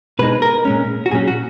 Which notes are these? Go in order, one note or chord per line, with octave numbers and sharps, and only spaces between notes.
B2 G#3 D#4 B4
A#4
A#2 G#3 C#4
F#4
A#2 F#3 C#4 G#4
F#4